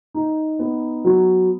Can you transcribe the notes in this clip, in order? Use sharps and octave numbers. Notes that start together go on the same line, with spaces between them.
D#4
B3
F#3